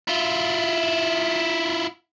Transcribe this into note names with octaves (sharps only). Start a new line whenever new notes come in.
E4 F4